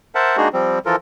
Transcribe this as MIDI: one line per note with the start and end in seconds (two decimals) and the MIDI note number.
0.15 0.37 70
0.15 0.37 72
0.15 0.37 76
0.15 0.37 78
0.15 0.37 81
0.37 0.48 56
0.37 0.48 58
0.37 0.48 62
0.37 0.48 63
0.37 0.48 66
0.37 0.48 68
0.53 0.79 53
0.53 0.79 55
0.53 0.79 60
0.86 0.96 52
0.86 0.96 53
0.86 0.96 65
0.86 0.96 69
0.86 0.96 70